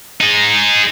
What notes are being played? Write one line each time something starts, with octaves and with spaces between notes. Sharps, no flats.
D#4 G#4